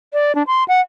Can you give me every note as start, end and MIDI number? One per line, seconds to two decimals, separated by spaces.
0.13 0.35 74
0.35 0.43 62
0.47 0.64 84
0.68 0.81 78